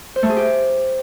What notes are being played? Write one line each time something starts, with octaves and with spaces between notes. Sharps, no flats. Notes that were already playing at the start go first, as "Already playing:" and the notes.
C5
A3
G#4
G4